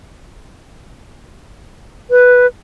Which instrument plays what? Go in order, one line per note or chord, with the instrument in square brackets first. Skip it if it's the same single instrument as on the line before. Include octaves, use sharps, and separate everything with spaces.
[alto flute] B4